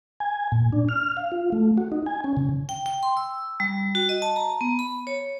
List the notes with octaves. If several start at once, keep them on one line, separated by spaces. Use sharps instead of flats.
G#5
A#2
D4
F6
F5
F4
A3
F#4
D#4
G#5
C#4
C#3
G5
G5
C6
E6
G3
F#4
D#5
A5
A#5
B3
B5
C#5